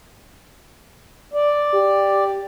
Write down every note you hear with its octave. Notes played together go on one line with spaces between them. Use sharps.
D5
G4